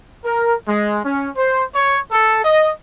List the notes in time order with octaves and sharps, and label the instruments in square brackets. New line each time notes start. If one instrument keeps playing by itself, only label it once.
[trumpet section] A#4
G#3
C#4
C5
C#5
A4
D#5